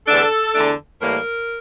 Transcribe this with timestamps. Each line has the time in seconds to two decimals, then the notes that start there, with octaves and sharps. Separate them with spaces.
0.07 E2 D3 A3 D4 A4
0.55 E2 D3 A3 D4
1.01 A2 E3 G3 A#3 A#4